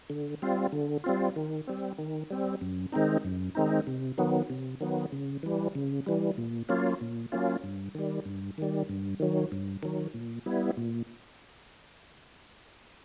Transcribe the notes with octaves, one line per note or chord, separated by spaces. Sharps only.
D3
G3 C4 F4
D3
G3 C4 F4
D#3
G3 C4
D#3
G3 C4
F#2
D#3 G#3 C4 D#4
F#2
D#3 G#3 C4 D#4
C3
D#3 F#3 B3
C3
D#3 F#3 B3
C#3
E3 G3
C#3
E3 G3
A#2
F#3 A#3 C#4 F4
A#2
F#3 A#3 C#4 F4
G2
D#3 G3
G2
D#3 G3
G2
D#3 F#3
G2
D#3 F#3
A#2
G3 B3 E4
A#2